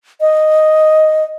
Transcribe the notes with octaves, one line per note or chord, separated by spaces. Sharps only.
D#5